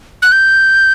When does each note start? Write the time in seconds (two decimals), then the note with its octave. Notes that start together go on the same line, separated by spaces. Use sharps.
0.22 F#6
0.32 G6